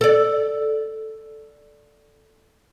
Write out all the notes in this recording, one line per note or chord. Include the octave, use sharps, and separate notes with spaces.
A4 D5